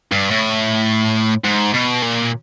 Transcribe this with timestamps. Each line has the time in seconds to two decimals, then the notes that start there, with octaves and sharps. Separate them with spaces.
0.12 G2
0.31 A2
1.44 G#2
1.74 B2
2.02 A#2